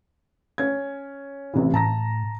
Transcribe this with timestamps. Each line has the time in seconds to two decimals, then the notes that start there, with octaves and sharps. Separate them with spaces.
0.58 C#4 G#6
1.54 A1 C3 E3
1.74 A2 A5 A#5 A#6